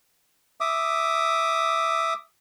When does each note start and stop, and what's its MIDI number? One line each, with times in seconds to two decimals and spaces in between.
0.61 2.14 76
0.61 2.14 86
0.61 2.14 87